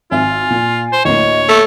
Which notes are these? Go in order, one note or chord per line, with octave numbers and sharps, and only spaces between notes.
G#1 F4 E5 G#5
A#2
C5
D2 A2 A#3 C#5 D#5
A3 A#3